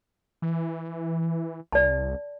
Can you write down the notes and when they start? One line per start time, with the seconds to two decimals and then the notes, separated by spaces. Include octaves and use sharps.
0.42 E3
1.72 C2 D5 A5